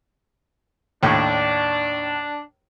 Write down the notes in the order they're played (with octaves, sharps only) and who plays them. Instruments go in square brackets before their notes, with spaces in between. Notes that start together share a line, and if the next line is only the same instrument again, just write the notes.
[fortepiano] D#2 A2 [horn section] D4